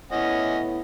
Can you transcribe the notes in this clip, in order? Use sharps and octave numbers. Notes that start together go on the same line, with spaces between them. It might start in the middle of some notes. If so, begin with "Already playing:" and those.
A2 B3 C#4 E4 D#5 F#5